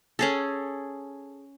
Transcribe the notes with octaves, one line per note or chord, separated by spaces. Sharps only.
C#4 G#4 A4